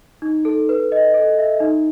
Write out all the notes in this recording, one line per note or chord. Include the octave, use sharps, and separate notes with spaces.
D#4
A4
B4
D#5
A4
E5
D#4